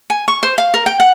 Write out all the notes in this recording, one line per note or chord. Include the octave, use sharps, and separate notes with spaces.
G#5
C#6
C5
F5
A#4
G5
F#5